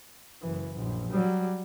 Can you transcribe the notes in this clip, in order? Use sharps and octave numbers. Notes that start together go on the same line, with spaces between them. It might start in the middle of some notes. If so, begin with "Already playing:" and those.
F#1 E3
A#1 F#2
F#3 G3